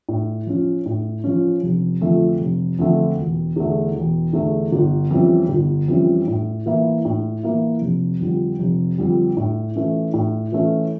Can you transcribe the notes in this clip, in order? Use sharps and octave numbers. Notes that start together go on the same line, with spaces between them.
A2
F3 C#4
A2
F3 C#4
F1
F2 D3 F3 A3
F1
F2 D3 F3 A3
E1
E2 D3 A3
E1
E2 D3 A3
G1
F2 E3 G3 C#4
G1
F2 E3 G3 C#4
A2
E3 A#3 E4
A2
E3 A#3 E4
F1
F2 D3 G3
F1
F2 D3 G3
A2
E3 A3 C#4
A2
E3 A3 C#4